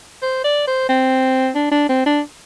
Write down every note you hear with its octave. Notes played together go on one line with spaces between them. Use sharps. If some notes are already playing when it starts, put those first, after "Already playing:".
C5
D5
C5
C4
D4
D4
C4
D4